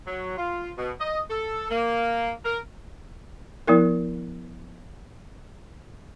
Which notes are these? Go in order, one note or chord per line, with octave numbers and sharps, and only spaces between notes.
F#3
F4
B2
D#5
A4
A#3
A#4
F3 B3 E4 A#4